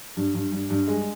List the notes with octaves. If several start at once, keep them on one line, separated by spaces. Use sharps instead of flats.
G2
G2
G2
G2
G#3